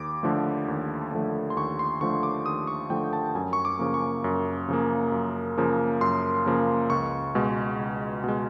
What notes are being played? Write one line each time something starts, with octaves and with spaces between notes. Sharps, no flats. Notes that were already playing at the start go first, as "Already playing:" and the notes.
Already playing: D#2 D6
D3 F3 A3
D#2
D3 F3 A3
C6
D#2 C#6
C6
D3 F3 A3 C#6
D6
D#2 D#6
C#6
D3 F3 A3 G5
A5
F#2 G#5
C#6
D6
C#3 F3 A#3
C#6
F#2
C#3 F3 A#3
F#2
C#3 F3 A#3
F#2 C6
C#3 F3 A#3
C#2 C#6
B2 G#3
C#2
B2 G#3